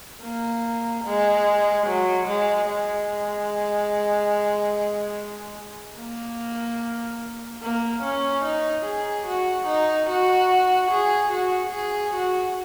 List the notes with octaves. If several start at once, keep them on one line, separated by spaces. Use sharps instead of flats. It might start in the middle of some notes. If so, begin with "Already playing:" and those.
A#3
G#3
F#3
G#3
G#3
A#3
A#3
C#4
D#4
G#4
F#4
D#4
F#4
G#4
F#4
G#4
F#4